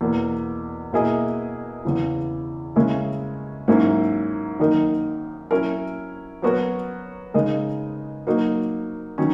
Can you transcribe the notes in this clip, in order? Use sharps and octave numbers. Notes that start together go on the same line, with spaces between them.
E2 B2 A#3
B2 A#3 E4 G#4 D#5
E2 C#3 E3
C#3 G#3 C#4 E4 A#4
G#2 F#3 A#3 C#4 E4
F#2 D#3 A#3 D#4 A#4
F#3 C#4 E4 A#4
F#3 B3 F#4 A#4 C#5
C#3 G#3 D#4 A#4 D#5
F#3 A#3 D#4 F#4
D#3 F#3 C#4